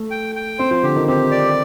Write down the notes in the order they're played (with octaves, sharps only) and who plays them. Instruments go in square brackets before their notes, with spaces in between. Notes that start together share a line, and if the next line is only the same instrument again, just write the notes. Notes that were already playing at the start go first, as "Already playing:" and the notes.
Already playing: [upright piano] A3
[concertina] G5
G5
[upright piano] C4 [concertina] C5
[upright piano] F3
[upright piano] D3 [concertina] G4
[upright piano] D#3
[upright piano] C4 [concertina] G4
[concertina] D5